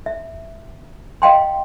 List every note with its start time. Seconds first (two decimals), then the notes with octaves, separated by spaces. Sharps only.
0.06 E5
1.22 D#5 F5 G5 C6